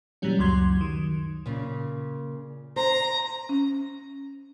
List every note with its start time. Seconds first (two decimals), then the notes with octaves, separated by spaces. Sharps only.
0.22 A#2 E3 F#3 G3 C#4
0.39 C#2 F#2 F#3 C6 G#6
0.81 D#3
1.46 A#2 C#3
2.76 C5 A#5
3.49 C#4